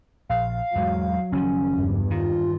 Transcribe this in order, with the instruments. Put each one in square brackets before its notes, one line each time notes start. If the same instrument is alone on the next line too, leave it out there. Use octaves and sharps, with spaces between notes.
[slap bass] A#1 [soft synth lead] F5
[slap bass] E2 G#2 G#3 [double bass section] F#3
[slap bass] F#1 D#3 F3 [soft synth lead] C#4
[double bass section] E2 G2
[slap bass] D#3 [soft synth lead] F4